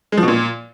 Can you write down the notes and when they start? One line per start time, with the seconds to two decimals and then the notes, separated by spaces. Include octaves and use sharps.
0.12 G#3
0.18 F3
0.23 B2
0.28 A#2